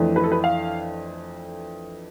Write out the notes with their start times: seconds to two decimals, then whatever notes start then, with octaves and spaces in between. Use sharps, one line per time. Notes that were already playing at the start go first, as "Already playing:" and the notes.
Already playing: F2 E3 A3 D4
0.16 B4
0.24 A4
0.32 B4
0.44 F5